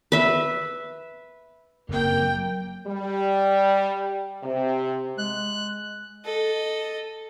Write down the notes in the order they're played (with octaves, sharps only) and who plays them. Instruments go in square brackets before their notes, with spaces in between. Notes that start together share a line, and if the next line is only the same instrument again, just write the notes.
[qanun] B4 E5
[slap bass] F#1 F#2 C4 [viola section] A#3 G5
[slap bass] F#3
[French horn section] G3
C3
[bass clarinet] G#3 [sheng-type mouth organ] F#6
[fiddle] A4 D#5